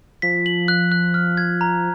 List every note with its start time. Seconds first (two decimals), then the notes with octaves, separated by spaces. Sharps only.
0.22 F3 B6
0.46 F#7
0.68 F#6
0.92 F#6
1.14 F6
1.37 G#6
1.61 A#5